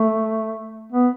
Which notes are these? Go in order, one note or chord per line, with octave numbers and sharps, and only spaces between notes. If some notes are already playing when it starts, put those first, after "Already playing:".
Already playing: A3
B3